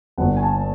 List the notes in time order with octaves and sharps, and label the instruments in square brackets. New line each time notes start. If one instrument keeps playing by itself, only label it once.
[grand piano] G1 F#5
G#5
A5